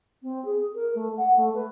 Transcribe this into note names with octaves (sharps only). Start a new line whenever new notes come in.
C4
G#4
A#4
A3
F#5
A3
B4